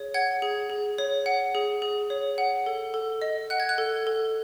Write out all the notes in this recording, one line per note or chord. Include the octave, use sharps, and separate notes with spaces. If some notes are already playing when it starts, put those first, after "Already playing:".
Already playing: G#4 C#5
F#5 G#6
G#4
G#4
C#5
F#5
G#4
G#4
C#5
F#5
A4
A4
D#5
F#5 F#6
G#6
F#6
A4
A4